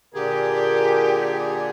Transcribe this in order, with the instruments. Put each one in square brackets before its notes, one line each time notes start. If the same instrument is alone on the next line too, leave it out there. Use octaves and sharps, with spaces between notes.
[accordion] A#2 D3 G#4 [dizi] G4 [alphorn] A#4